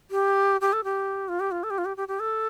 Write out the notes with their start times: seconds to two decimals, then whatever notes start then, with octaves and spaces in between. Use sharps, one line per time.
0.11 G4
0.61 G4
0.73 A4
0.84 G4
1.28 F4
1.40 G4
1.51 F4
1.63 A4
1.70 G4
1.78 F4
1.85 G4
1.97 G4
2.08 G4
2.20 A4